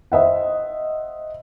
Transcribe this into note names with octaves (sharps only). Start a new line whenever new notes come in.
C5 D#5 E5 F#5